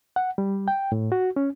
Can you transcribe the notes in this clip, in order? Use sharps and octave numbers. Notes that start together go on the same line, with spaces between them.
F#5
G3
G5
A2
F#4
C#4